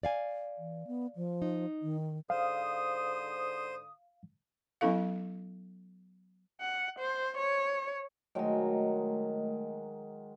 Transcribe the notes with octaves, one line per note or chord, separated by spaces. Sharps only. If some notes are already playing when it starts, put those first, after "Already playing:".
D5 F5 G#5
E3
B3
F3
D#4
D#3
G#2 D3 C5 F5 D#6
F#3 B3 C#4 E4 A4 F5
F#5
C5
C#5
D#3 F#3 G#3 A3 D#5